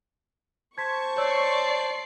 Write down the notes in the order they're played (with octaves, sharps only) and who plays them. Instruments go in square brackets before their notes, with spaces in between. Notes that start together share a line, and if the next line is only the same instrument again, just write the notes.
[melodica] C5 A5 [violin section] C#6 [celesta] G#6 B6
[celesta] C#5 E6 [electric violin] D5 C7